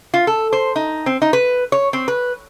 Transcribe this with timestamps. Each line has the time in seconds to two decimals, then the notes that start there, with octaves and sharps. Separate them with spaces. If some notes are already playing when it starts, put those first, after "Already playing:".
0.14 F4
0.27 A4
0.53 C5
0.76 D#4
1.06 C4
1.22 D#4
1.33 B4
1.72 C#5
1.93 C4
2.08 B4